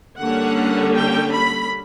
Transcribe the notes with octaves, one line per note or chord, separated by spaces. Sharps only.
D3 G3 A#3 C#4 F#5
G5
B5